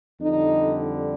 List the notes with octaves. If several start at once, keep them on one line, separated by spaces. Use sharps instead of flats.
F2 D3 G3 D#4